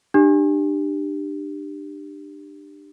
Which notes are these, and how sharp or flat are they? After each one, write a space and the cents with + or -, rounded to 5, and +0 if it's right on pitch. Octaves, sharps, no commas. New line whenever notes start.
D4 +30 G4 +5